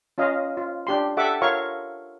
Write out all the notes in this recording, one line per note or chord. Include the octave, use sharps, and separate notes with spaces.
C#4 F4 D#5 F5
F4
D4 G4 C6
G4 A4 E5 F#5 D6
F4 A#4 C#5 F5 C#6